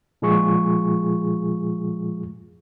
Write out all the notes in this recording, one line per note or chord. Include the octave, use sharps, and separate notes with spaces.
A#2 F3 G#3 F4 G#4 C#6